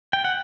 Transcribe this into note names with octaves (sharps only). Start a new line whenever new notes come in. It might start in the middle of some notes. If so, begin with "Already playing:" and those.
G5
F#5